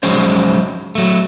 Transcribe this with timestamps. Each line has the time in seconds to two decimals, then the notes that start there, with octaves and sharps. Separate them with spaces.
0.03 F3 F#3 G#3 C#4 C5
0.95 F#3 A3